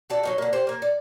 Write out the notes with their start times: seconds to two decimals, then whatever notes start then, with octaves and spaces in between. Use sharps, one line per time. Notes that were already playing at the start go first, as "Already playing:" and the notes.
0.10 F#4 A4 D5
0.23 F#3 A#3 D#4
0.38 D3 A#3
0.53 G4 C5 D5
0.67 A#3 A#4
0.82 D5